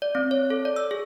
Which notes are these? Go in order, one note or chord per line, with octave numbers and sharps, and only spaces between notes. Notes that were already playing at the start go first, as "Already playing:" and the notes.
D5
C4
C#5
A4
D5
E6
G#4